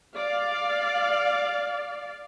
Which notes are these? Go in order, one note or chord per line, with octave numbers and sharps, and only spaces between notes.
D5 F5